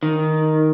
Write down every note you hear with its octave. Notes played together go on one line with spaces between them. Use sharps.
D#3